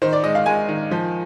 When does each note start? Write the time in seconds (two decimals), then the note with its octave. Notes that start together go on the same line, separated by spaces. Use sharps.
0.02 D#3 C5
0.13 D5
0.23 G#3 D#5
0.35 F5
0.46 G#3 G#5
0.69 D#3
0.91 F3